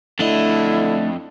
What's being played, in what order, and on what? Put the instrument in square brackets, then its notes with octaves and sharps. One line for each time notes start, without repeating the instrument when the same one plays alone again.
[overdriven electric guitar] F2 D#5 [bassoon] D3 [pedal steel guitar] A3 D4 [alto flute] E4